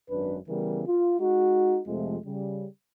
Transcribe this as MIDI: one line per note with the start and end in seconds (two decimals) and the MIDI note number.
0.10 0.38 32
0.10 0.38 42
0.10 0.38 62
0.10 0.38 71
0.48 0.83 49
0.48 0.83 52
0.48 0.83 55
0.48 0.83 59
0.48 0.83 70
0.87 1.20 65
1.20 1.80 56
1.20 1.80 63
1.20 1.80 66
1.87 2.18 41
1.87 2.18 48
1.87 2.18 53
1.87 2.18 56
1.87 2.18 57
2.26 2.67 49
2.26 2.67 55